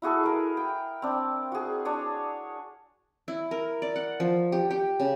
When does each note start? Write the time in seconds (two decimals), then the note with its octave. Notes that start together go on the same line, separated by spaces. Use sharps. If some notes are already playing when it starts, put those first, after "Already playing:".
0.02 E4 F#4 G#4 A4
0.24 E4 A#4
0.57 G5
1.02 C4 D4
1.52 F#4 G#4
1.85 D4 C#5 D#6
3.28 E4
3.51 A#4
3.82 D5
3.96 F#5
4.20 F3
4.52 G4
4.71 G4
5.00 C#3